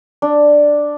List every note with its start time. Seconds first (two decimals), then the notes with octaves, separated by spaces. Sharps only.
0.22 D4